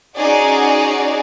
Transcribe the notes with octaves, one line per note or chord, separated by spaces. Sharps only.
C#4 D#4 F#4 G#4 D5